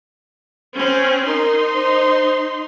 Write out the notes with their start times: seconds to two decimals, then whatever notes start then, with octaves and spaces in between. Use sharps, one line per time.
0.76 C4 C#4
1.27 D#4 A#4 C6
1.75 C5